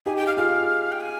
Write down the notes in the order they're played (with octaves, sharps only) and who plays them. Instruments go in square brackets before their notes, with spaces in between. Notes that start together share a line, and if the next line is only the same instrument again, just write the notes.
[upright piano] D#4 G4 [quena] G#5
[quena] G5
F5
[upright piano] F4 G#4 [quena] F5
[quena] G5
G#5